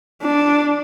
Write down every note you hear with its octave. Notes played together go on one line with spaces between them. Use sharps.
D4